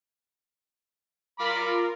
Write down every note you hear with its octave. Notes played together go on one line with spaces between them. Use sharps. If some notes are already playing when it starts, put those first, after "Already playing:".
F4 A#4 B5 D6